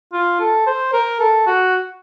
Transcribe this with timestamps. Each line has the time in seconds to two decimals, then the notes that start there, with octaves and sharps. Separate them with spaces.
0.13 F4
0.40 A4
0.66 C5
0.93 A#4
1.20 A4
1.47 F#4